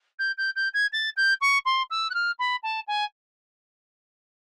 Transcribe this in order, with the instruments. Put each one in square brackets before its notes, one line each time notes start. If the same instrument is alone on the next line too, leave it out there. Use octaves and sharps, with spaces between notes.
[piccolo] G6
G6
G6
G#6
A6
G6
C#6
C6
E6
F#6
F6
B5
A5
G#5